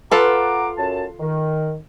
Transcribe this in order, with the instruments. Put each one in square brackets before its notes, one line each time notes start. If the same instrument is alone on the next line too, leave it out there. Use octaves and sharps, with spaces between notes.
[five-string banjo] F4 A4 B4 [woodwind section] F#5 A#5 D6
[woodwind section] F#2 A5
D#3